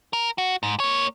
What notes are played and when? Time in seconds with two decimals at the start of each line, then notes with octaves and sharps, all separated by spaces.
0.13 A#4
0.38 F#4
0.63 G#2
0.80 A#3 C#5